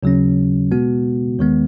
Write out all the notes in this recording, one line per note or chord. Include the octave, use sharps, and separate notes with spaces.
D#2 C#3 F#3 C#4
B2 G#3 B3 F#4
D#2 D#3 G#3 B3